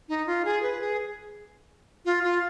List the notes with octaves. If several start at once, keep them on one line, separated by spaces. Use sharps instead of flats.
D#4
F4
G#4
B4
G#4
F4
F4